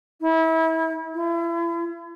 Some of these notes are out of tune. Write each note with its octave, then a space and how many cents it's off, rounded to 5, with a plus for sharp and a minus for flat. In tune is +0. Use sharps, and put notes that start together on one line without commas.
E4 -30
E4 +40